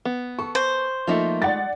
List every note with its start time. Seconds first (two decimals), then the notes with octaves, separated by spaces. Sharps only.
0.05 B3
0.39 A4 C#6
0.55 C5
1.07 F3 A3 A#3 D#4 F4 E5
1.42 G#3 D5 F#5 A6